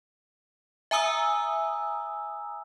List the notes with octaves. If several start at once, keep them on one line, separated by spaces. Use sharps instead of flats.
E5 G#5 A#5 D#6 E6